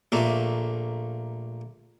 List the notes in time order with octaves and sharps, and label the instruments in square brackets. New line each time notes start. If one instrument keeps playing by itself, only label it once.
[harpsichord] A#1 A3 A#3